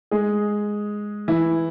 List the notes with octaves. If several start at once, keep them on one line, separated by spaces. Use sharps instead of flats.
G#3 G#4
E3 E4